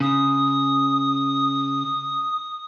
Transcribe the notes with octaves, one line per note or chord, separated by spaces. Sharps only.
C#3 D#6